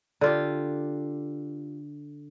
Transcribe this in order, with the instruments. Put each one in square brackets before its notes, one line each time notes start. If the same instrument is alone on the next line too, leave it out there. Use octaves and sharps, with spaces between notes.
[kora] D3 F4 G4